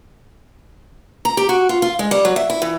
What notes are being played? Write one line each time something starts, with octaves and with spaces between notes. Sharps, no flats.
A#5
G4
F#4
F4
F4
G#3
G3
F#3
E5
E4
E3